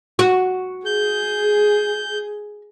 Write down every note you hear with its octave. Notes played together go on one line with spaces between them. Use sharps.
F#4
G#4 G6